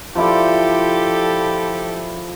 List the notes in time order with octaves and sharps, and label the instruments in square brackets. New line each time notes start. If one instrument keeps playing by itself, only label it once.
[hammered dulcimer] F3 E4 D5 [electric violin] G4 A4